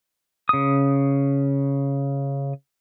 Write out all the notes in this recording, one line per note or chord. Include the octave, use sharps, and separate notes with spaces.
C#3 D#6